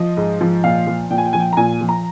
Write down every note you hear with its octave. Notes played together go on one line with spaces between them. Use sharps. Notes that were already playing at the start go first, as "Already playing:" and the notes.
Already playing: F3 D#5
G#2
F3
A#2 F5
F3
A#2 G5
G#5
G5
F3 G#5
G5
A#5
A#2 G#5
F3
A#5